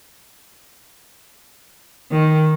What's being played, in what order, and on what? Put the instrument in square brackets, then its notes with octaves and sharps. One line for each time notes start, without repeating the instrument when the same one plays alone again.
[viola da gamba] D#3